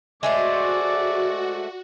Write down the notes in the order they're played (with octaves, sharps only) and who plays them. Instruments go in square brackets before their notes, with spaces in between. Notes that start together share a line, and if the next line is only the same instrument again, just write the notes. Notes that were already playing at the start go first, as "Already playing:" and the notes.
[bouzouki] G#3 A3 C5 [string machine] F#4 [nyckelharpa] D5